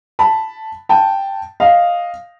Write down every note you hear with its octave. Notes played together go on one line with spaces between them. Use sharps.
A5 B5
G5 A5
D#5 F5